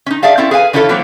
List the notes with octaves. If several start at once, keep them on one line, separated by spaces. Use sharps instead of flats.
C#4 D#4
G#4 D5 E5 F5 A5
C4 C#4 E4 A4
G#4 B4 F5 G#5
E3 D4 E4 F4 A4 C#5
E3 F#3 A#3 C4